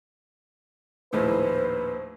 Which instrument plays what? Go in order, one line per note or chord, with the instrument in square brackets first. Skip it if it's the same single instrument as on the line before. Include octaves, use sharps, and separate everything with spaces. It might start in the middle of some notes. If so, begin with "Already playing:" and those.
[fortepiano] A#1 D#2 A2 [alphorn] B4 [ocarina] C5